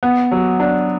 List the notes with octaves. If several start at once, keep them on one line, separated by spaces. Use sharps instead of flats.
B3
F#3
D4